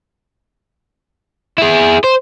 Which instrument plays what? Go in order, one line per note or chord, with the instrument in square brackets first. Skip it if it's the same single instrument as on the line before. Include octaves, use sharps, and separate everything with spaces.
[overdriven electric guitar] E4 G#4
C5